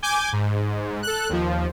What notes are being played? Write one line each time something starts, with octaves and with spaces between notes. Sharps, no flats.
G#5 D6 G6
G#2
A4 F#6
D#2 F3